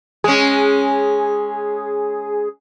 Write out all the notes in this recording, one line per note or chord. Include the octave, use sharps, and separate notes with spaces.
G#3 C#4 G#4